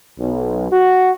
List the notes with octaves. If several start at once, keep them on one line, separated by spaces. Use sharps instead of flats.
B1
F#4